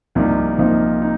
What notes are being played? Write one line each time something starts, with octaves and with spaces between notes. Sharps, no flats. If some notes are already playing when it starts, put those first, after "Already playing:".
C2 C3 F3 A#3 D#4
C2 C3 F3 A#3 D#4
D#4